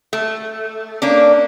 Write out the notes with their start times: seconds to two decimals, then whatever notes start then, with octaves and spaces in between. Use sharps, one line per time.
0.13 A3
1.02 A#3 C#4 D4